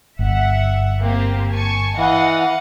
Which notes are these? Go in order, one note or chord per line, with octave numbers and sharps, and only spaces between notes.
G1 E5 F#5
A#3 C4 G4
G#5 A5 C#6
E3 D#5 F5 F#5